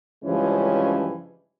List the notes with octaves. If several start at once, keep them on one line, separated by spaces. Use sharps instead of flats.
G2 C#3 E3 F3 G#3 C#4